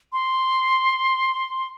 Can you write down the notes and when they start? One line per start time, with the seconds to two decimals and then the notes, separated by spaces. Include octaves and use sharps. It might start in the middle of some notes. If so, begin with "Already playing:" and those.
0.13 C6